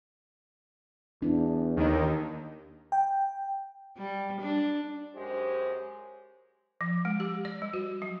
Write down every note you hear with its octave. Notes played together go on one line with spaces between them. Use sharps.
E2 D4
D#2 D#3
G5
G3
D4
F#2 G#3 G4 C5
F3
G#3
G4
D5
G3
F#4
F#3